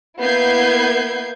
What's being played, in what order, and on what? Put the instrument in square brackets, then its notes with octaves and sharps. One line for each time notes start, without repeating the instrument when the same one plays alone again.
[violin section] A#3 B3 E4 G6 G#6 C7